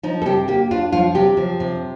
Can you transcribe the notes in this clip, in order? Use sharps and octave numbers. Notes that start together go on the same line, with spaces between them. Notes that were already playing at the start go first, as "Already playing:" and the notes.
F3 D#4
A4
C3 G4
A#3 G4
D4 F4
F3 F4
C3 G4
F3
C3